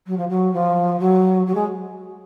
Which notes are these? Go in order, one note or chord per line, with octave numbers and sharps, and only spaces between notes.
F#3
F3
F#3
F3
F#3
F#3
G#3